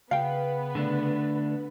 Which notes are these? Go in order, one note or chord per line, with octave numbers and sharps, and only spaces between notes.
C#3 B3 B4 F5 G5
D3 A3 D4